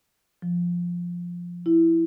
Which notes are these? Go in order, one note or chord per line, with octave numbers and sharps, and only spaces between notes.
F3
E4